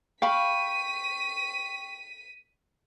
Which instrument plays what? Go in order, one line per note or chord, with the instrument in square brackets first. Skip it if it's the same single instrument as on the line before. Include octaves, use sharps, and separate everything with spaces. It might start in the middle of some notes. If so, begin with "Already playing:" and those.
[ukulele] F5 B5 [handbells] G5 C#6 [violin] B6 D#7